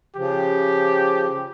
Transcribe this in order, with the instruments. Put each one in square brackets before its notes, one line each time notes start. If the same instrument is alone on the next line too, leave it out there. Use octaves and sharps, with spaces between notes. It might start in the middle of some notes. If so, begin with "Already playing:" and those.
[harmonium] C#3 F3 [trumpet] G4